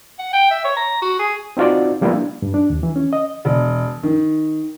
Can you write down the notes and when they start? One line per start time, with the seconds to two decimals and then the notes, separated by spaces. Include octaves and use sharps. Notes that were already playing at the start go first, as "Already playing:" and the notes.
0.19 F#5
0.33 G5
0.51 E5
0.64 C#5
0.77 A#5
1.02 F#4
1.19 G#4
1.57 C4 D#4 F4 F#4 D5
2.01 F3 G3 A#3 B3 E4 F4
2.13 D4
2.42 G2
2.54 D4
2.70 D#2
2.83 E3
2.96 C#4
3.13 D#5
3.45 E1
4.03 D#3